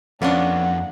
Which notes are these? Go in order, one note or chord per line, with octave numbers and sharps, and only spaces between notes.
F2 A#3 B3 C#4 D4 F#5